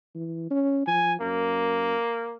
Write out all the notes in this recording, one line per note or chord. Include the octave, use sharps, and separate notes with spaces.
E3
C#4
F3 G#5
F#2 A#3